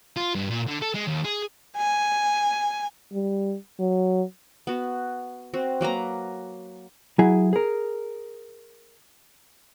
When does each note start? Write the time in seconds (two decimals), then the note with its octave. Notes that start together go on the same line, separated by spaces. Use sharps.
0.17 F4
0.35 G2
0.50 A#2
0.67 D3
0.82 A4
0.94 G#3
1.07 D#2
1.24 G#4
1.77 G#5
3.13 G3
3.79 F#3
4.67 B3 F#4
5.54 C4 F#4
5.81 F#3 A#3 B4 A#5
7.19 F#3 E4 G#4 G#5
7.53 G#4 A#4